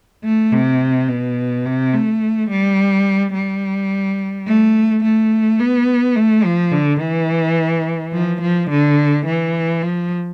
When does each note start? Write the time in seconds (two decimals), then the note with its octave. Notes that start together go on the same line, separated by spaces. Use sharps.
0.24 A3
0.52 C3
1.09 B2
1.65 C3
1.93 A3
2.50 G3
3.34 G3
4.47 A3
5.04 A3
5.60 B3
6.16 A3
6.44 F3
6.72 D3
7.01 E3
8.13 F3
8.42 F3
8.70 D3
9.26 E3
9.82 F3